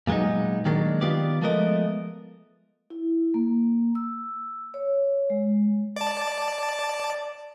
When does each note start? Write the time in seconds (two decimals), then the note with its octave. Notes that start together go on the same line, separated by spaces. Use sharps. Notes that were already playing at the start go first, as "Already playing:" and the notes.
0.07 A#2 F#3 G#3 B3 D#4
0.65 D#3 F#3 G#3 A#3 D4
1.01 D#3 B3 F4 G4 D5
1.42 F3 G#3 A3 B3 A#4 D#5
2.90 E4
3.34 A#3
3.95 E6
4.74 C#5
5.30 G#3
5.96 D5 A5